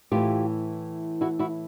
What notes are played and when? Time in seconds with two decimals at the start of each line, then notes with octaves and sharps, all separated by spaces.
0.11 A2 E3 F4 G4
1.21 E4 F#4
1.39 E4 F#4